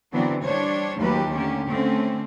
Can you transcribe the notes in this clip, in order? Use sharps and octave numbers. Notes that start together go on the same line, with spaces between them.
D3 E3 F#3 B3 C4 D4
G3 D4 C5 C#5
D#2 F3 F#3 A3 G4 B4
D3 A3 A#3 C#4 G4
D3 A3 C4 C#4